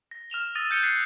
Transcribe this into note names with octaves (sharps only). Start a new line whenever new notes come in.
A#6
F6 E7 F7 G7
D#6 E6 A6 A#6 D#7 F7
F6 G6 G#6 C#7 D#7 G7
F#6 A6 B6 C7